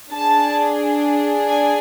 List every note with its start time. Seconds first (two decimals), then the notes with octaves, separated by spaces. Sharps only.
0.12 D4 G#4 A5
1.48 G#5